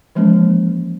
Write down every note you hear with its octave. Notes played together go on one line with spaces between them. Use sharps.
E3 F3 G#3 A#3 C#4